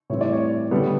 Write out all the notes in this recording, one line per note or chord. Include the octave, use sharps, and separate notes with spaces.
A2 E3 G3 C4 C#5
D5
C#5
D3 G3 B3